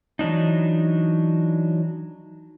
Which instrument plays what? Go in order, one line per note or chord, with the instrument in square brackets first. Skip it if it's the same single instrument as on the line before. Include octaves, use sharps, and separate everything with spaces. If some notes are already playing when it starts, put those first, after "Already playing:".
[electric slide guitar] E3 F#3 D4 D#4